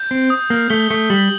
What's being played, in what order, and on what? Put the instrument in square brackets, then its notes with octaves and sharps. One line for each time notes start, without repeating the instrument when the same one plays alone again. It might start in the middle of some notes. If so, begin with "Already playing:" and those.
Already playing: [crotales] G6
[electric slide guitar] C4
[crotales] D#6
[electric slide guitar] A#3
[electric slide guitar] A3 [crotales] G7
[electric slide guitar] A3
[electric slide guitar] G3 [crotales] F#7